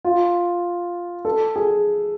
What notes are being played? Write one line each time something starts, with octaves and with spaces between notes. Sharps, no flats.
F4
A4
G#4